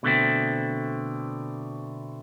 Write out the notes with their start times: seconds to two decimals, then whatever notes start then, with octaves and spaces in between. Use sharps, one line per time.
0.03 B2 D3 A3 C4